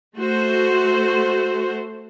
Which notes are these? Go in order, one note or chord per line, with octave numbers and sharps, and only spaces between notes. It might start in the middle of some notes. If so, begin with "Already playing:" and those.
A3 F#4 C5